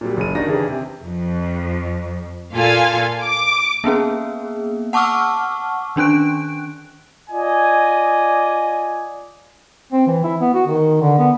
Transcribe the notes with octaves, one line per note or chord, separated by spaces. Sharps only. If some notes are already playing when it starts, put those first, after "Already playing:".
A#2 F#3 G3
F#1 C#4 D#7
D#3 D4 D#4 F#4 A#5 A#6
C#3 E3 D4 E4 G4 G#4
C3
F2
A#2 F4 A4 F5 G#5
D6
A#3 B3 C#4 G#4
F#5 A5 C#6 D6 E6 F6
D#3 C#4 D4 F#6 D7
F4 D5 D#5 G#5
C4
E3
E4
B3
F#4
D#3
D3
B3